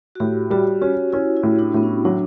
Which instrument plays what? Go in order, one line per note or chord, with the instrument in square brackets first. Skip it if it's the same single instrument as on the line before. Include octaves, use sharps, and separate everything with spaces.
[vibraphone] F#4
[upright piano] A2 [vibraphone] G4
[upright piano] G3 [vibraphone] F#4
[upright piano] C#4 [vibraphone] F#4
[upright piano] C#4 [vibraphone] E4
[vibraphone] E4
[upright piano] A2
[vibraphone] D4
[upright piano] A2 [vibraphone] B3
[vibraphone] C#4
[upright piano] F#3 [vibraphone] D4